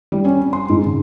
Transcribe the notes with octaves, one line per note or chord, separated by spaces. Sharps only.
G3
C#4
C4
C6
G#2
C#3